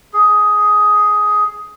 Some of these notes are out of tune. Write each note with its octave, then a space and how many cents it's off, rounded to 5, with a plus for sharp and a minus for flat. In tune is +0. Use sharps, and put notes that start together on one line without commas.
G#4 +10